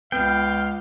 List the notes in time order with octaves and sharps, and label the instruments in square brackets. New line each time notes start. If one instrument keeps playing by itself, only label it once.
[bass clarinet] C#2 [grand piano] B3 [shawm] F5 [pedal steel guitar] G5